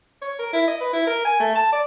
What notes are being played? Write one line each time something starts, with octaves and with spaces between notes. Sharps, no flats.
C#5
A#4
E4
D#5
B4
E4
A#4
G#5
A3
A5
D5